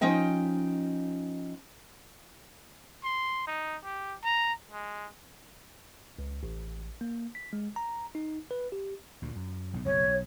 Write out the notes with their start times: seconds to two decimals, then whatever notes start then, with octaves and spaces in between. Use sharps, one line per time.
0.01 F3 C#4 D#4 D#5 G5
3.04 C6
3.47 D#4
3.84 G4
4.24 A#5
4.71 G#3
6.19 C#2
6.43 A1
7.01 A#3
7.35 B6
7.53 G#3
7.76 A#5
8.15 D#4
8.51 B4
8.72 G4
9.22 D2 A#2
9.36 F#2
9.74 B1 A2
9.85 F#1 B1 F#2 C#5
10.08 B1